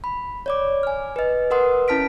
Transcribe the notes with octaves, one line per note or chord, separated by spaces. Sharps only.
B5
C#5 D5 D6
G#5 F6
B4 D#5
A#4 B4 F#5 C6 D#6
C#4 E4 A5 F6 B6 D7